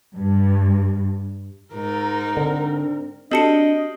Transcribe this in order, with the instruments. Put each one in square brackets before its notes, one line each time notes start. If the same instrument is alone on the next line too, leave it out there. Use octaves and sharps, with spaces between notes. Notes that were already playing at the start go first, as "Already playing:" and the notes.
[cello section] G2
[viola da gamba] G#2 D#4 [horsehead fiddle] A#4
[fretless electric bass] D3 [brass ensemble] C4 D4
[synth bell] C4 F#4 G4 [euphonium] D4 [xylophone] A4 A5 C#7 [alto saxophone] D#5